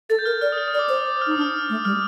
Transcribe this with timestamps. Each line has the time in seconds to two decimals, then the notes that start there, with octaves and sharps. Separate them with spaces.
0.10 A4 A6
0.19 G6
0.25 A#4 F6
0.41 D5 F6
0.52 D#6
0.58 F6
0.68 D#6
0.74 D5
0.79 D6
0.89 C5
1.05 D6
1.21 F6
1.27 D#4 D#6
1.37 D4
1.41 F6
1.69 A3
1.85 G3 F6